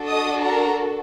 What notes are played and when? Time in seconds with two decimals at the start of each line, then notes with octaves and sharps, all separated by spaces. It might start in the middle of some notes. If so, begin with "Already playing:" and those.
Already playing: D4 F#4 A4
0.10 D#5 D#6
0.43 A#4 A#5